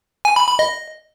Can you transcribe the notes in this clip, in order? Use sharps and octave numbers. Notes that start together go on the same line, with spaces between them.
G#5
B5
B5
D#5